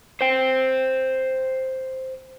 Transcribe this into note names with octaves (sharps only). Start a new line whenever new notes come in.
C5 G5